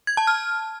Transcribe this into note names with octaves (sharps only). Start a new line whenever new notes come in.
G#6
A5
F6